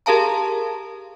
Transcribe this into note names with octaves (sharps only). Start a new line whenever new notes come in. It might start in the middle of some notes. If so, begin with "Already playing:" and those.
G4 G#4 A#4 F5 A5 A#5